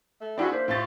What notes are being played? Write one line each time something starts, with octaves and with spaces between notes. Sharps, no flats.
A3
C4 D4 E4 F#4 G#4 B5
A#3 D4 C5 E5
A2 F4 A6